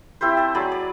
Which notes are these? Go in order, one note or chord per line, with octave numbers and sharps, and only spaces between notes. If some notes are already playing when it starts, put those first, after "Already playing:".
C4 E4 G4 C5
C5 A5
F#3 G#4 D5 B5
D5